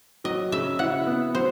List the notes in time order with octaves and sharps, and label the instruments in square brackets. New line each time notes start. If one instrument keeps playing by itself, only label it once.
[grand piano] F#3 [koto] D#5
[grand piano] C#3 [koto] E5
[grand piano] E4 [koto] F#5
[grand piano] B3
[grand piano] F#3 [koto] C5